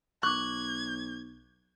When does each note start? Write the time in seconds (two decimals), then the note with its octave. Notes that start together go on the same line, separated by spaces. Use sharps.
0.23 B1 C#6 D6 F#6 G#6